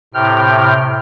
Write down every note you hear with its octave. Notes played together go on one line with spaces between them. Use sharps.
A2 C3 G5 F6